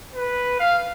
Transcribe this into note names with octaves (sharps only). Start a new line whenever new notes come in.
B4
F5